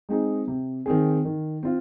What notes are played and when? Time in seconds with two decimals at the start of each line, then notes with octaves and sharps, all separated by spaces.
0.09 G#3 C4 D#4 G#4
0.47 C3
0.86 D#3 C4 G#4
1.25 D#3
1.63 C4 F4